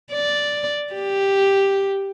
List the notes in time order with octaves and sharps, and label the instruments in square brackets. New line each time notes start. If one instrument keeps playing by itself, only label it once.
[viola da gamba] D5
G4